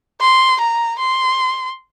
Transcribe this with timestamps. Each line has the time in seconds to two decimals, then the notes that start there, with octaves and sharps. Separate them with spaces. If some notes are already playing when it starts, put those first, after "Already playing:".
0.21 C6
0.60 A#5
0.99 C6